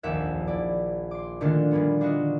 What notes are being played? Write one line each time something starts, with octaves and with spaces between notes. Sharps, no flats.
F1 A#1 D#2 A#3 E5 F#5
E4 D5
C6 D6
A#2 D3 D#3 A3 D4 F4
A#2 G3 A#3 B3
D4 F4 F#4 D#5